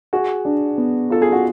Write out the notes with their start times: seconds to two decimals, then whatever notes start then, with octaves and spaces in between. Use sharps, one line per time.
0.13 F#4 G#4
0.45 D4
0.78 B3
1.10 F4 A4
1.22 G#4
1.32 F#4